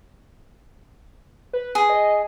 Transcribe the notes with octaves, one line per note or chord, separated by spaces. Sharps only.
B4
G#4
D#5